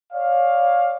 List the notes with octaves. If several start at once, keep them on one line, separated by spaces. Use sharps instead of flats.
C#5 D5 F5